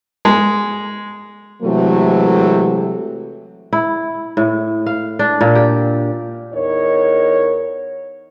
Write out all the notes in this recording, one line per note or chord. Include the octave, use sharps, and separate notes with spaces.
G#3
C3 E3 F#3 G#3 A3
E4
A2
F5
D4
A#2
G4
E2 D#4 A#4 C#5